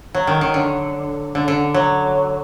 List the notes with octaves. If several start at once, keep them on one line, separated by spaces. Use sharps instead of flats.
F#3
D#3
D#3
D3
D3
D3
F#3